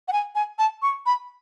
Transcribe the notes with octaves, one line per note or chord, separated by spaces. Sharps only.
F#5
G#5
G#5
A5
C#6
B5